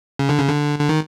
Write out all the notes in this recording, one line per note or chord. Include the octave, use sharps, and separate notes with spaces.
C#3
D3
C#3
D3
D3
D#3